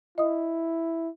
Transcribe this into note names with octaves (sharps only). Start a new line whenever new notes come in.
E4 D#5 D#6